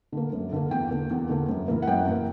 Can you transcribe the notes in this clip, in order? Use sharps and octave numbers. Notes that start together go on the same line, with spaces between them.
D3 A#3
F#2
D3 A#3
E2 G5
D3 A#3
E2
D3 A#3
F#2
E3 A#3
F#5
F#2 G5
E3 A#3